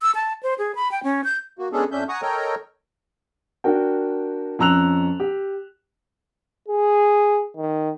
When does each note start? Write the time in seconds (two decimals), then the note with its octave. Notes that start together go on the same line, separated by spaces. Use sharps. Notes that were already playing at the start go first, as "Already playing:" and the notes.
0.02 E6
0.15 A5
0.43 C5
0.58 G#4
0.75 B5
0.92 G5
1.03 C#4
1.24 G6
1.59 A#3 F#4
1.72 G#3 B3 C#4 D4 G#4 A4
1.92 F2 C#4 D4 E5 G6
2.09 F#5 G#5 A#5 C#6 D#6
2.22 A4 A#4 C#5 D#5 G5 A#5
3.64 D4 F#4 A#4 G5
4.59 F2 C#4 A#5 E6 F#6 F7
5.20 G4
6.68 G#4
7.57 D#3